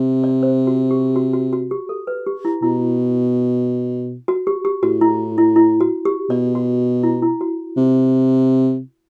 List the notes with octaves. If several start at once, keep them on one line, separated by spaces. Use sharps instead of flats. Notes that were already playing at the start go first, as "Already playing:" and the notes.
Already playing: C3
D5
C5
F#4
G4
F#4
F#4
F#4
G4
A4
B4
G4
E4
B2 E4
F#4
G4
G4
A2 F#4
E4
E4
E4
F#4
G4
B2 D5
F#4
E4
E4
F#4
C3